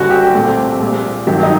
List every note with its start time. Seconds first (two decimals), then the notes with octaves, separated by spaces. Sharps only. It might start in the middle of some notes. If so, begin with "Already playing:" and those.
Already playing: F#1 F#2 D3 G3 F#4
0.11 G4
0.34 C2 A#2 A3 C4
0.80 A#1 A#2 G3
1.27 G2 D#3 F#3 G4
1.43 D#4